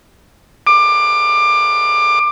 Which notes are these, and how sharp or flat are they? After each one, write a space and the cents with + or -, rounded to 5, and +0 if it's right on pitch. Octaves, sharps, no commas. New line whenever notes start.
D6 +20